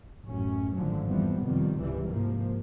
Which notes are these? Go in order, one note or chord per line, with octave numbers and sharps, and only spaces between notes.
A1 F#2 C#4
G#1 A2 D3 F3 F#3
F2 E3 F3 G3 B3
F2 C3 D#3 G3
C#2 G#2 C3 E3 G3
G#2 C3 F3 A#3